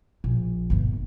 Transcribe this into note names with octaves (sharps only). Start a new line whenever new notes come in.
A#1
G1 A3